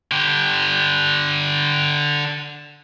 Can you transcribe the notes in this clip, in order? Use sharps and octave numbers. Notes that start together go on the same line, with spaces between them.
D3 G4